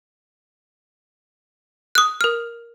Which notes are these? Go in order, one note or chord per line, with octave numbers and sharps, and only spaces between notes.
D#6 F#6
A#4 F6